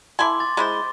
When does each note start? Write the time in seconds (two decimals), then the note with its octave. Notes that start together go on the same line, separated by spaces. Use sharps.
0.19 E4 A4 G#5 C6 D6
0.40 A6
0.57 G#3 E4 C5